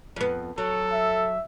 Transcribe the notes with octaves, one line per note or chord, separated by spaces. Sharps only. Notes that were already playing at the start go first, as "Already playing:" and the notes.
F2 B3
F#3 A4
E5